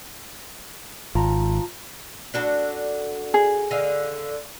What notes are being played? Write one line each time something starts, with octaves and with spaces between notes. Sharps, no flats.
G#1 F4 A5 A#5
D4 F#4 A4
G#4
D3 D#5 F5